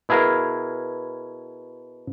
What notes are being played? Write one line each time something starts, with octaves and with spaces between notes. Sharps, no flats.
B2 E4 G#4 A#4 F5